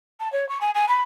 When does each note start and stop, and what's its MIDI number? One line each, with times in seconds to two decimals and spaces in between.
0.20 0.31 81
0.32 0.48 73
0.49 0.58 85
0.61 0.71 80
0.74 0.88 80
0.88 1.02 83